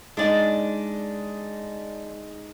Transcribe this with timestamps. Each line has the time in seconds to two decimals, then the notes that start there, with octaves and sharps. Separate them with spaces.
0.17 G#3 D4 D#4 D5 D#5